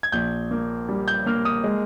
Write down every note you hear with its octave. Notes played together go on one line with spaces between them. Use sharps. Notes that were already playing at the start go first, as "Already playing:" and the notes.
G#6
A#1 G6
A#3
G3
G6
A#3 F6
D#6
G#3